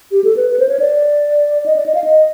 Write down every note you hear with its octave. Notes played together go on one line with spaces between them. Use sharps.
G4
A4
B4
B4
C5
C#5
D5
D#5
D5
D#5
F5
D#5